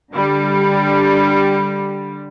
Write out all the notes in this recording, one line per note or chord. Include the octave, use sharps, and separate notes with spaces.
D3 G3